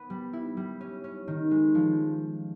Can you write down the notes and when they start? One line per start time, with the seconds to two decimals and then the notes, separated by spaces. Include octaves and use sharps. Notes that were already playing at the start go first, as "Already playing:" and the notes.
Already playing: B3
0.10 G3
0.33 E4
0.57 G3
0.81 C#4
1.04 C#4
1.28 D#3
1.51 G#3
1.75 F3